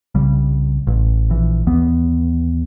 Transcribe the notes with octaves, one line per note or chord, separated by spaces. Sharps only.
C2 C#3 G3
A1
A#1 E3
D#2 E3 B3